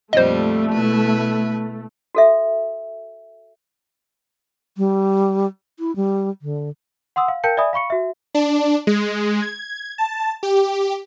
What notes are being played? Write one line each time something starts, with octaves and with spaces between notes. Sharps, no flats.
F2 A#2 G3 A3 C5 D#5
B2 E4 B4
F#4 A4 E5
G3
E4
G3
D3
F#5 C6 D#6 E6
F5
A#4 F5 G5 A5 G6 C#7
D5 E5 G#5 B5 D#6
F5 B5 C#6 C#7
F#4 E5
D4
G#3
G#6
A5
G4